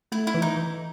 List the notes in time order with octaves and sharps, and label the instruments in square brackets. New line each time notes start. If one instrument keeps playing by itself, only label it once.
[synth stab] A3 [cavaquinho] E4
[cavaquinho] E4
[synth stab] E3
[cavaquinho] D#4
[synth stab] E3